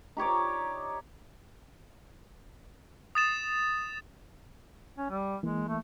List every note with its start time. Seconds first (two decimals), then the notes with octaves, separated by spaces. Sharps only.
0.17 D#4 G4 C#5 D5
3.15 D#6 A6 E7
4.98 C#4
5.10 G3
5.43 E3 G#3 A#3
5.68 A3